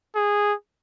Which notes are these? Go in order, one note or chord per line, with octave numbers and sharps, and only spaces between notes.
G#4